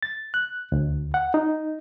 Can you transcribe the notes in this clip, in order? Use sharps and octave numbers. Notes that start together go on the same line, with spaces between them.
A6
F#6
D2
F#5
D#4